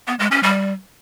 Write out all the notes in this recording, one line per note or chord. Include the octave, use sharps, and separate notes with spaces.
B3
G#3
C#4
G3